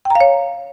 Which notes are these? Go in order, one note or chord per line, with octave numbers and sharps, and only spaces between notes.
G5
A#5
F5
C#5